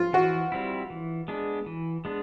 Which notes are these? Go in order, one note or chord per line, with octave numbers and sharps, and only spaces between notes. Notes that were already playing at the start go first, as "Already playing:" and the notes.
Already playing: F4
E3 F#4
G3 C4 E4
E3
G#3 B3 D4
E3
G#3 B3 D4